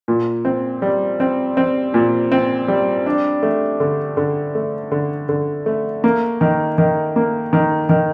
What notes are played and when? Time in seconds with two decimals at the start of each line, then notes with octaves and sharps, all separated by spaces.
0.08 A#2
0.45 C4
0.82 G3
1.20 C4
1.57 C4
1.94 A#2
2.32 C4
2.68 G3
3.06 D4
3.43 A3
3.80 D3
4.17 D3
4.55 A3
4.92 D3
5.29 D3
5.66 A3
6.04 A#3
6.41 D#3
6.78 D#3
7.16 A#3
7.53 D#3
7.89 D#3